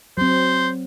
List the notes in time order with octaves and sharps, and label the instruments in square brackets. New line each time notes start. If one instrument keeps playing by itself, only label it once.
[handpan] F#3 C4 [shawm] C5